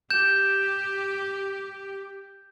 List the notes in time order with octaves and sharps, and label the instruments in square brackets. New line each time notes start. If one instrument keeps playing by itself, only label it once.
[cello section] G4 [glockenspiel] G6 E7